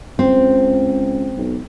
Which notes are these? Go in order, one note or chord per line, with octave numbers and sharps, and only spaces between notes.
C#2 C4
B1